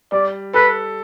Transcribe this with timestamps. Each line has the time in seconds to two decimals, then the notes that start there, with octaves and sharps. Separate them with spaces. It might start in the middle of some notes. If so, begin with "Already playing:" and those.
0.12 G3 D5
0.54 A4 B4